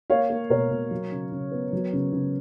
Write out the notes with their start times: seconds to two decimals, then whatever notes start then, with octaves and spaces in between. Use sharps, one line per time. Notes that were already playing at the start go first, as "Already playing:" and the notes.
0.10 A#3 C#5 F5
0.30 A#3
0.50 B2 A#4 C#5
0.71 B2
0.91 F#3
1.12 C#3
1.32 C#3
1.52 B3
1.73 F#3
1.93 C#3
2.13 C#3